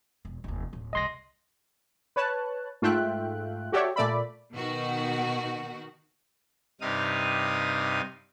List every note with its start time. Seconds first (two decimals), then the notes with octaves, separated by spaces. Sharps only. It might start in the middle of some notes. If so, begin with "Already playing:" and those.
0.25 E1
0.44 F1 D#2
0.73 D1
0.93 C2 F#2 D#5 C6 A#6
2.16 B4 C#5 A5 F#6
2.82 G#2 A3 F4 E5 G5 F#6
3.72 F#4 G4 A4 C#5 D5 E5
3.96 A#2 A3 D5 E5 B5
4.54 B2 D#3 F#4
6.81 G2 C3 D#4 F5 D#6